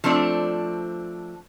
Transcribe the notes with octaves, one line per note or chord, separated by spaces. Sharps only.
F3 A3 C4 D4